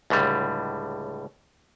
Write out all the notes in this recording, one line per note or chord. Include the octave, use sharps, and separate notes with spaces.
C#2 A2 D3 G3